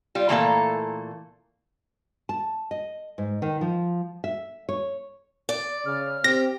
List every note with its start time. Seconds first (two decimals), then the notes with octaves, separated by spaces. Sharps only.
0.15 G3 F4
0.29 A#2 E3 A3 A#3 A4 F5
2.29 A5
2.71 D#5
3.18 G#2
3.42 D#3
3.61 F3
4.24 E5
4.69 C#5
5.49 D5
5.86 C#3 F6
6.24 C4 G4 A#6